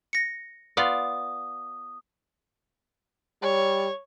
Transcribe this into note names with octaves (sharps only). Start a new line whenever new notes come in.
A#6 C#7
B3 F4 D5 D#6
G3 C#5